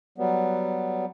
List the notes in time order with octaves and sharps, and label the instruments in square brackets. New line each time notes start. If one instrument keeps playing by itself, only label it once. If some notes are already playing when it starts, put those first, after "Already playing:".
[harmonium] F#3 G3 B3